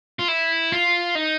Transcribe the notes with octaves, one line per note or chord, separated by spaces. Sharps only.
F4
E4
F4
D#4